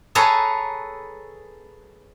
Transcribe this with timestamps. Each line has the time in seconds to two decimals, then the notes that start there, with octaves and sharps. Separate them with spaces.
0.15 G#4 A4 B4 C#5 A5 A#5